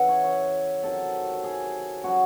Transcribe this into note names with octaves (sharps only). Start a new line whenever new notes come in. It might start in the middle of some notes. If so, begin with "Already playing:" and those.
Already playing: C#3 E3 E5 F#5
C#5
C#5
C3 D#3 F#3 A4
G#4
C#3 F#3 F#4